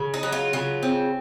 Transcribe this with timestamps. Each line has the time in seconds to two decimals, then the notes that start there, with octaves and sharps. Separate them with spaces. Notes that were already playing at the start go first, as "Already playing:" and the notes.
Already playing: C#3
0.14 D#4
0.23 F#3
0.32 F4
0.53 C#3 F4
0.83 C4